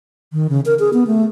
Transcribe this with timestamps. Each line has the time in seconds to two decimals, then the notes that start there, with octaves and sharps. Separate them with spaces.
0.33 D#3
0.50 C#3
0.66 A#4
0.79 G#4
0.93 B3
1.07 A3